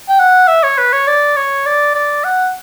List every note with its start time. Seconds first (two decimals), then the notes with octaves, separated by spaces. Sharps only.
0.09 G5
0.19 F#5
0.48 E5
0.63 C#5
0.78 B4
0.93 C#5
1.07 D5
1.36 C#5
1.66 D5
1.95 D5
2.24 F#5